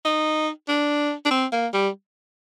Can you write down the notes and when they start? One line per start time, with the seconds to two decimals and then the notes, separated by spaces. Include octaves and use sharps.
0.05 D#4
0.68 D4
1.25 D4
1.31 C4
1.52 A#3
1.73 G3